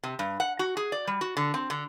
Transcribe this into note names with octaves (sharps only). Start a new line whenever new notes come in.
C3
G2
F#5
F#4
G#4
D5
G3
F#4
D3
C4
D3